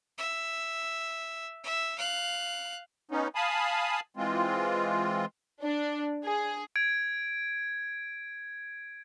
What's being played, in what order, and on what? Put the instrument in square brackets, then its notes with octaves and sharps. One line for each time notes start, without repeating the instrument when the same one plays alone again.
[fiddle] E5
E5
F5 F#6
[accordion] B3 C#4 D#4
F5 G#5 A5 B5 D#6
E3 G#3 C4 F4
[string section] D4
G#4
[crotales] G#6 D7